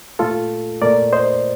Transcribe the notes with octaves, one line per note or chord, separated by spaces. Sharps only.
A#2 A3 F4 A4
A#2 A3 A#4 D5
C5 D#5